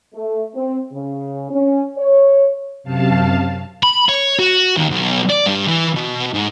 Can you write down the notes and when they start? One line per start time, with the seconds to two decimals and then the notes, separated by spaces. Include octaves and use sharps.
0.14 A3
0.55 C4
0.92 C#3
1.51 C#4
1.98 C#5
2.84 F#2 C3 F5 A5
3.83 B5
4.09 C#5
4.40 F#4
4.77 D#2
4.91 B1
5.29 D5
5.46 G2
5.66 E3
5.95 B2
6.34 G#2